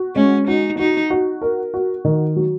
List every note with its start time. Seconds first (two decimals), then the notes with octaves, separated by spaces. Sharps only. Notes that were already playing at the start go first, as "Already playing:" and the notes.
Already playing: F#4
0.16 G#3 C#4
0.48 D#4 F#4
0.79 D#4 F#4
1.10 F#4
1.42 A#4
1.74 F#4
2.05 D#3
2.36 F#3